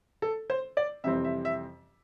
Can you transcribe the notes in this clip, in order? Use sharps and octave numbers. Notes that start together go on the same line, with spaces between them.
A4
C5
D5
F2 C3 E3 G3 C4 E5
E5
E5